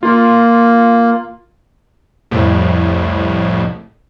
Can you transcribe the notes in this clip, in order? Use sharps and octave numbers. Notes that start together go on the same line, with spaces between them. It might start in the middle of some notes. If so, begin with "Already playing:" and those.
A#3 F4
C2 F2 A2